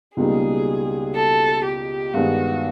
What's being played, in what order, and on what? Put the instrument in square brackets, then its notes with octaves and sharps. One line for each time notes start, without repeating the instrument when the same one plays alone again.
[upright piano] C#2 B2 G3 A#3 D#4 [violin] G#4
[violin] A4
G4
[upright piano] G2 D#3 G#3 B3 [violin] F#4